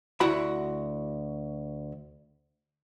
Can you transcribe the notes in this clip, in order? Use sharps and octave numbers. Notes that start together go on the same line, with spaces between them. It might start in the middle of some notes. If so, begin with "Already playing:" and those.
D2 E4 F#4 F#5 B5